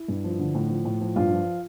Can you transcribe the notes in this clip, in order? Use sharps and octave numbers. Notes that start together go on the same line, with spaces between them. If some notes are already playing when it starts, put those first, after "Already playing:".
Already playing: E4
G2
F3
D3
A2
F3
A2
F3
G2 F4
F3